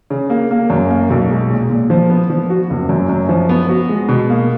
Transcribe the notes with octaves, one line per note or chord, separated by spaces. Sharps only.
C#3
A#3
A#3
F#2
A#3
B1
G#3
A#2
A#2
F3
B3
F3
F#4
F#1
F#2
F#2
F3
B3
F#4
G#3
B2
A#3